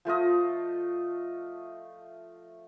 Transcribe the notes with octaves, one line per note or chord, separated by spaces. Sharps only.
F3 A3 F4 D#5